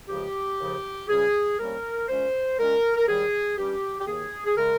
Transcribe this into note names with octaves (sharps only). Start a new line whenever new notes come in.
C#2 C#3 F3 G#3 G4
D#2 C#3 F3
C#2 C#3 G3 C#4 G#4
C3 G3 A#3 C#4 A#4
A#2 G#3 C#4 C5
A#2 G#3 C#4 A#4
A#4
D#2 D#3 G3 G#4
G2 G3 C#4 G4
G4
D#2 D#3 A#3 G#4
G#4
C#3 G#3 A#4